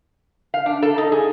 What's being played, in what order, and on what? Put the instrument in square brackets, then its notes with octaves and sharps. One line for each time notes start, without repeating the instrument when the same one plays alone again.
[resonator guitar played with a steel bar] F5
D4
A4
D#4
G#4